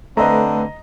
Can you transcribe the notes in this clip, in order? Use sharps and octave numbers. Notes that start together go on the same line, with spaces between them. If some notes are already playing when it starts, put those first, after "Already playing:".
D3 A3 C4 B4 D#5 A#5